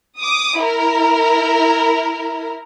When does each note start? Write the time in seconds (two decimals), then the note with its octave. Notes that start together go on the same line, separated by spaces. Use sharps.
0.19 D6 D#6
0.62 E4 A#4